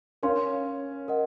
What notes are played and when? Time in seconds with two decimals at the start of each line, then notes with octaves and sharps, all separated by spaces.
0.23 C#4 A#4 C#5 F5 C6
1.08 A#4 D#5 F#5